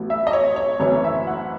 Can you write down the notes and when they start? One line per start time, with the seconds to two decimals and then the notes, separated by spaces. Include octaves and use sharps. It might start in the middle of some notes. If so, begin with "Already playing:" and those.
Already playing: A1 A2 F#3 B3
0.10 E5
0.27 D#5
0.33 C#5
0.56 C#5
0.80 F#1 F#2 E3 A3 C#5
1.04 E5
1.27 F#5